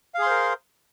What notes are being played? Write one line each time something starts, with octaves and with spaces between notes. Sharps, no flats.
G#4 A#4 C5 F5 C6